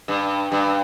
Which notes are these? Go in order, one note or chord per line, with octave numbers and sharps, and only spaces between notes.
G2
G2